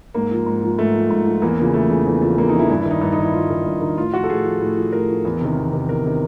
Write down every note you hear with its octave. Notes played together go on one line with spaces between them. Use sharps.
G#2 A#3
F3
G#2
F3
G#2 A3
F3
G#2
F3
E2 A#3
C#3 F3 A#3
E2 A3
C#3
F3
E2 A3
C#3 F3
E2 A#3
D#4
C#3 F3 E4
G2 E4
E4
D#3 D#4
G2 D#4
D#4
D#3
E4
G2 F4
D#3
G2
D#3
A2 F4
F3 F#4
A4
A2 G#4
F3
A2
F3
A2 A#4
F3
E2
C3 D#3
E2
C3 D#3
E2 A#4
C3 D#3